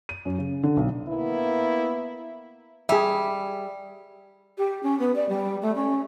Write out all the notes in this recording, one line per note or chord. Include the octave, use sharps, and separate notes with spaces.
D#7
F#2
C#3
D3
B1
A#3 B3 E4
G3 G#4 E5
G4
C#4
B3
D5
G3
A3
C#4